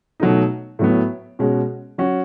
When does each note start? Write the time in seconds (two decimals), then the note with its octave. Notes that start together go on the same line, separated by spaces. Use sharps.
0.20 B2 F#3 A3 D#4
0.79 A2 F#3 B3
1.39 B2 G#3 C#4 F#4
1.98 F#3 C#4 F#4